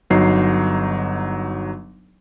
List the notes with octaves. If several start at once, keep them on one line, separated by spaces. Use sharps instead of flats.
G1 F#3 D#4 C7